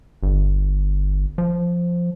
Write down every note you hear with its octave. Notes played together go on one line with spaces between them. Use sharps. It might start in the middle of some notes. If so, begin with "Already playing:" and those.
G1
F3